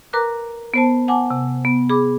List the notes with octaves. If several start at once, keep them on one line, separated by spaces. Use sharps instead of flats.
A#4 B4 A#5 D6 F#6
B3 C5 A5
F#5 G#5 A5 D6
C3
B3
G#4 B5 D6